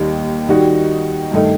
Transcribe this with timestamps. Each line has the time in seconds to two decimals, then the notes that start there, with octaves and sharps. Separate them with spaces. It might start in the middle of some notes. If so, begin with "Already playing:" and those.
Already playing: D#2 D#3 G3 D#4
0.48 D#3 G3 D#4 F#4
1.32 G2 D#3 A3 D#4